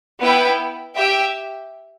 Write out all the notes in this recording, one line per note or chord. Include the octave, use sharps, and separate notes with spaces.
B3 E4 B4 G5
G4 E5 G5